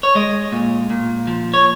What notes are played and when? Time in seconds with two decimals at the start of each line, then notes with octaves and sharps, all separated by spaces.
0.03 C#5
0.15 G#3 D#5
0.52 A#2
0.90 A#2
1.27 F3
1.54 C#5